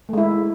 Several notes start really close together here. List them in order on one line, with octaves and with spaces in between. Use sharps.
A3 G#3 E4